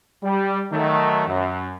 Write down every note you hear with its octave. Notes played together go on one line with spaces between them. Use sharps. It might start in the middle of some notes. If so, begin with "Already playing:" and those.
G3
D#3 F#3 A3
F#2